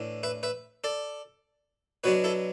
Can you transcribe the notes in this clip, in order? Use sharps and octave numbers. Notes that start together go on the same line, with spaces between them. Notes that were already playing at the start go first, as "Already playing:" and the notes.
Already playing: A2 E3 D4
B4 E5
B4 E5
A4 D5
B2 F#3 B3 D4 F#4 B4
E4 A4